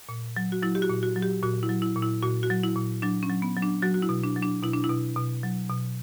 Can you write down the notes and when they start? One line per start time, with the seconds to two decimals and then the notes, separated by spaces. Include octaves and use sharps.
0.09 A#2
0.37 F#3
0.52 F#4
0.62 F#3 E4
0.75 G4
0.82 F#4
0.90 A#2
1.03 F#4
1.16 F#3
1.22 G4
1.43 A#2 F#4
1.63 E4
1.69 F#3
1.82 E4
1.96 A#2
2.02 E4
2.22 A#2 F#4
2.43 F#4
2.50 F#3
2.63 E4
2.76 A#2
3.02 F#3 D4
3.23 C#4
3.30 F#3
3.42 B3
3.56 F#3
3.62 D4
3.82 F#3 F#4
3.94 F#4
4.02 E4
4.09 B2
4.23 D4
4.36 F#3
4.43 D4
4.63 B2 E4
4.73 D4
4.84 E4
4.89 B2
5.16 B2
5.43 F#3
5.69 B2